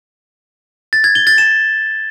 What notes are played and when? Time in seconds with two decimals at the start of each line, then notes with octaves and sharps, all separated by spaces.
0.93 A6
1.04 G#6
1.15 G7
1.27 A6
1.38 E7